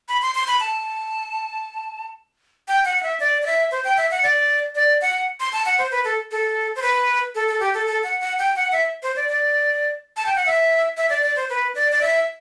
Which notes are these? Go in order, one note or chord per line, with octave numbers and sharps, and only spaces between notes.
B5
C6
C6
B5
A5
G5
F#5
F#5
E5
D5
D5
E5
C5
G5
E5
F#5
D5
D5
F#5
C6
A5
F#5
C5
B4
A4
A4
C5
B4
A4
A4
G4
A4
A4
F#5
F#5
G5
F#5
E5
C5
D5
D5
A5
G5
F#5
E5
E5
D5
D5
C5
B4
D5
D5
E5